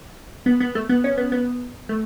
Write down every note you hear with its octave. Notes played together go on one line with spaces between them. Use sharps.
B3
B3
A3
B3
C#4
B3
B3
A3